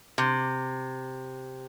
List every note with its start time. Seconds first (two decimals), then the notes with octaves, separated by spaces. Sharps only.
0.18 C3